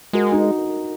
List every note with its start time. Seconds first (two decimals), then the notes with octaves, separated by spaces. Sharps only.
0.13 G#3 F#4 A#4
0.32 D#4 F#4